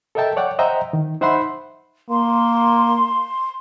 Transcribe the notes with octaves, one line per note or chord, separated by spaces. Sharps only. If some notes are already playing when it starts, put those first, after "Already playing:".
A4 A#4 D#5 E5 G5 A5
C#5 D5 F#5 G5
C5 D#5 E5 F#5 G5 A#5
D#3
D#4 C5 E5 F#5 B5 C6
A#3 C6